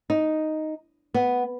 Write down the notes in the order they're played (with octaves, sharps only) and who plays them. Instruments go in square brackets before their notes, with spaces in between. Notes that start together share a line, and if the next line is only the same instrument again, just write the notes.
[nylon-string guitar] D#4
B3